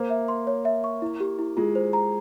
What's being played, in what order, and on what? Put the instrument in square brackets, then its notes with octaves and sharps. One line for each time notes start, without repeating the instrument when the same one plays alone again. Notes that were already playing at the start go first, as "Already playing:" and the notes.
Already playing: [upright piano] A#3 [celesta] C5
[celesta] E5
C6
C#5
E5
C#6
E4
G4
E4
[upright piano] G#3 [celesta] F4
[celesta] C5
A#5